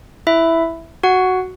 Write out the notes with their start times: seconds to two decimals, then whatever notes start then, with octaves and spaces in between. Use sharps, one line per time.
0.27 E4 E5
1.03 F#4 F#5